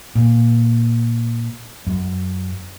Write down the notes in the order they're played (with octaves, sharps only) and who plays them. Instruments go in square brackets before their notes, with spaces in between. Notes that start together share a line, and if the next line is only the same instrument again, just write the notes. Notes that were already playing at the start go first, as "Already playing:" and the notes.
[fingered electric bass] A#2
F#2